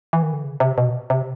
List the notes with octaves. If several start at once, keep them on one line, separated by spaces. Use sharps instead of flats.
E3
D#3
D3
C#3
C3
B2
C3